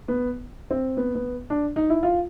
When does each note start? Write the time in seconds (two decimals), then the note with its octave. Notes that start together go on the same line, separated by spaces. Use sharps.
0.08 B3
0.71 C4
0.97 B3
1.15 B3
1.50 D4
1.76 D#4
1.90 E4
2.03 F4